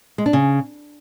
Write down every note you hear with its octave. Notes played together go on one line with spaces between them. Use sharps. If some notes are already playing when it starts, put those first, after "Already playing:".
G#3
D4
C#3